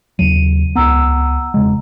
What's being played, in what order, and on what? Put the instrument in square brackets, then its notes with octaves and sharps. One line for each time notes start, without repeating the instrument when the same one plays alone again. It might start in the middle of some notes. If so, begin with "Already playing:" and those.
[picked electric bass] D#2 C#3 F#3 [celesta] D#7
[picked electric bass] C#2 B3 [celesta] F#5 A#5 E6
[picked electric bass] E1 C#3 G#3